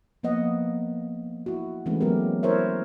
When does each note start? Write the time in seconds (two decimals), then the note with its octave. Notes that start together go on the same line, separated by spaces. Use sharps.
0.23 F3 A#3 B3 D#5 F#5
1.46 E4 F#4
1.86 E3 G#3 A3 C4 C#4
2.01 F#3 G#3 A#3 B3 G4 A#4
2.43 E4 A#4 C5 C#5 E5